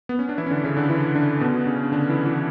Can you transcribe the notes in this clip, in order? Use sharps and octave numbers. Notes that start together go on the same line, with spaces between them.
B3
C#4
D4
E3 E4
C#4
D3 D4
C#3 C#4
D3 D4
E3 E4
D3 D4
B2 B3
D4
C#3 C#4
D3 D4
E3 E4
E3 E4